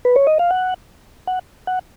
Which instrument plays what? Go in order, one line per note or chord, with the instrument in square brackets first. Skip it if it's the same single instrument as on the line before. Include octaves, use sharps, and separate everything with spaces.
[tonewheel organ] B4
C#5
D#5
F5
F#5
F#5
F#5